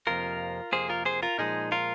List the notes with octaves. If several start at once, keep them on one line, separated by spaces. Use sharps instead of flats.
F2 C3 F3 A#3 F4 A#4
F2 C3 F3 A#3 G#4 C5
F4 A#4
G#4 C5
F4 A#4
A#2 F3 G#3 D#4 G#4
F4 A#4